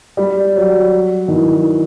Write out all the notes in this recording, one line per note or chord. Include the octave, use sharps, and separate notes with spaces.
G3
F#3
D#3
E3